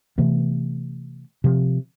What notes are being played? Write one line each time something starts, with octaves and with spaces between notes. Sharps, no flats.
C3 E3 A3 B3
C3 F3